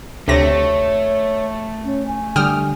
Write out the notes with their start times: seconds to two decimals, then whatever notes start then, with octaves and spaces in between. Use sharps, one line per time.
0.28 D2 C3 A3 C#5 A#6
1.84 C#4
2.07 G#5
2.36 D3 G3 G5 D#6 F6